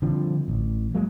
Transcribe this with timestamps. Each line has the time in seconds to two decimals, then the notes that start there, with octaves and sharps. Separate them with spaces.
0.02 D3 F3 G3 C4
0.48 A1
0.95 F#3 G#3 A#3